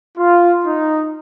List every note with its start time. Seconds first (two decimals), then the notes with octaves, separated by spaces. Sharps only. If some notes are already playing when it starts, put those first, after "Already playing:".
0.18 F4
0.66 D#4